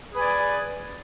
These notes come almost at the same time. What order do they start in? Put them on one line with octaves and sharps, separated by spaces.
G#4 B4 G#5 D5